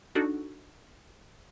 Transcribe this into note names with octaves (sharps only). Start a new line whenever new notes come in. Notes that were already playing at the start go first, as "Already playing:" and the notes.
D4 D#4 F#4 A4